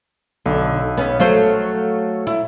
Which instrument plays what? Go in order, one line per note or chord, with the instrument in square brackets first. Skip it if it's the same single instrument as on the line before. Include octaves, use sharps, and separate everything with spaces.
[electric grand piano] B1 [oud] D3
[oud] B3 C#4
[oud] F#3 A3 C5 [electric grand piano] A4 C#5 F5
[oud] E4